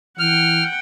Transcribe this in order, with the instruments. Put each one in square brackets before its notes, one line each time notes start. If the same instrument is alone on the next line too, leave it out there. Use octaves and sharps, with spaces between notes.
[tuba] E3 [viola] F#5 G5 [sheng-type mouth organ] F6